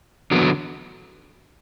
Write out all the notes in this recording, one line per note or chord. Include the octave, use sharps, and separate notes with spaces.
E2 D3 F#3 B3